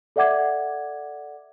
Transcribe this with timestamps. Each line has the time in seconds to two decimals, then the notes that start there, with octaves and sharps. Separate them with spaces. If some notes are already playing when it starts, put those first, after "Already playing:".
0.16 A4 D5 E5 F#5 D6 G#6